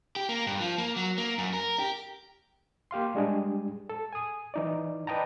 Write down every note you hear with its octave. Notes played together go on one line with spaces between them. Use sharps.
G4
A#3
G2
F3
A#3
F#3
A#3
F#2
A#4
G4
A#3 G4 F5 C6
G3 G#3 D4 G4 G#4
A4
G#5 D#6
E3 D#4 D5
B4 D5 D#5 G5 A5 A#5